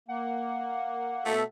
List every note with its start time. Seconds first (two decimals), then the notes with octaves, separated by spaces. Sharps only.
0.08 A#3 F#5
1.26 B2 A3 A4 E5